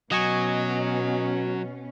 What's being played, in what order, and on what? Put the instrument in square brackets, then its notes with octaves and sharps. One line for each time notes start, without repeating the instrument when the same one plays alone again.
[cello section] B2 C#4 [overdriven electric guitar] F#3 [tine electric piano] D#5 G#5 C#6